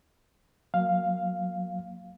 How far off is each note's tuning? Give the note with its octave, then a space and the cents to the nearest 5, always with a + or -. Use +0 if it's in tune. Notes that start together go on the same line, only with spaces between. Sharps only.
F#3 -20 A#3 -10 F5 +0